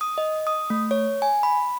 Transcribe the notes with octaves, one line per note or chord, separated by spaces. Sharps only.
D#6
D#5
D#6
A3
C#5
G#5
B5